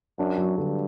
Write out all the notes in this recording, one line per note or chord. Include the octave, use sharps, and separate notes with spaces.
F#2 D4
F#3
G2 D3